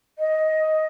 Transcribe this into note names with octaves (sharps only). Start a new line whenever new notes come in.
D#5